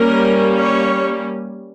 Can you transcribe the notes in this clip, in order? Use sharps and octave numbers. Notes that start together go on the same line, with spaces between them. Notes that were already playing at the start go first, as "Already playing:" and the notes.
Already playing: G3 A#3 C#4 A#4
C#5